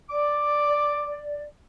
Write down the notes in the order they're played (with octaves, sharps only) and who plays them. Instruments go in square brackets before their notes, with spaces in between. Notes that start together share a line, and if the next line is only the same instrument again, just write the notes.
[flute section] D5 [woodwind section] D6